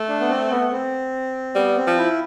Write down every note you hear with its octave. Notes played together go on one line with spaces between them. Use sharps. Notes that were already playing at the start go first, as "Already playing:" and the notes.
Already playing: A3
D4
B3
C4
B3
C4
G3 B3
C4
F3
E4